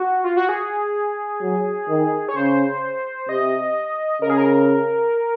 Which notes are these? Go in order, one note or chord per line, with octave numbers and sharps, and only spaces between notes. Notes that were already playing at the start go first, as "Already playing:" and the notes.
Already playing: F#4
F4
F#4
G#4
F#3
D#3
C#5
C#3 C5
C3 D#5
C#3 A#4
G#4
A#4